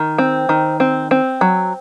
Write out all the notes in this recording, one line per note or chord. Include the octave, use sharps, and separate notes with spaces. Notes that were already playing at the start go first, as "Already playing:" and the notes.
Already playing: D#3
C4
D#3
C4
C4
F#3